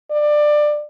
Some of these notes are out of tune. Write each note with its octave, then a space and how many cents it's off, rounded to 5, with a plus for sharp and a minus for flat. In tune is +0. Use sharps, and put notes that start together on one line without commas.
D5 +20